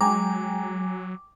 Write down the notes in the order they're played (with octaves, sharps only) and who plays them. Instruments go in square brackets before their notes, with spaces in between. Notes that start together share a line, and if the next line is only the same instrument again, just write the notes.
[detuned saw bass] F#3 [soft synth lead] G#3 [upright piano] G5 G#5 A#5 [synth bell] D6